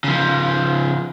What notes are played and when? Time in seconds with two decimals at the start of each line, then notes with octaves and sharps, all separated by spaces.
0.04 C#3 F3